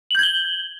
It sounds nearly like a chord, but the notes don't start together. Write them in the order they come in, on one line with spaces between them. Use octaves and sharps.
F#7 G6 G#6 G7